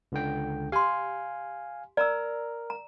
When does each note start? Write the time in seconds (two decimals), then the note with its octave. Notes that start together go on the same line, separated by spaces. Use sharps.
0.12 C#2 D3 G5
0.72 G4 F5 G#5 C6
1.97 A#4 D5 A#5 E6
2.70 A#5